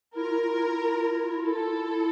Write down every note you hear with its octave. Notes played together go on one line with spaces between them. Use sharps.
E4 A#4
F4
E4
F4
E4
F4
E4
F4
E4
F4
E4
F4
E4
F4
E4
F4
E4
F4
E4 A4
F4
E4
F4
E4
F4
E4